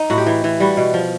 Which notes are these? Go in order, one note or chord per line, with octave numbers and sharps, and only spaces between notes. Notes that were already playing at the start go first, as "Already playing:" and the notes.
Already playing: D#4
A2 F#4
G4
E3
E3
G3 F#4
B2
F3